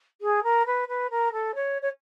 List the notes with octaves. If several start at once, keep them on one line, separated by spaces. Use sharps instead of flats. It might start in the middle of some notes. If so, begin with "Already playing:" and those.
G#4
A#4
B4
B4
A#4
A4
C#5
C#5